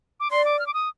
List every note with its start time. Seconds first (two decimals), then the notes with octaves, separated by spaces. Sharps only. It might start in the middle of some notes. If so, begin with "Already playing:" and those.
0.20 D6
0.31 D5 C6
0.45 D6
0.59 F6
0.67 D6
0.74 D#6